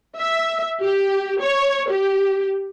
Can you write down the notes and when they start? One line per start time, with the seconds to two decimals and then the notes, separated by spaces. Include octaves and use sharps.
0.16 E5
0.81 G4
1.41 C#5
1.89 G4